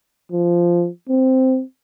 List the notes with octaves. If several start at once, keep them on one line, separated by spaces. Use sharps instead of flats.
F3
C4